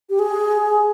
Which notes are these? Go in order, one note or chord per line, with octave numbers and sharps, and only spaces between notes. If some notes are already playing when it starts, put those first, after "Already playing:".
G4
G#4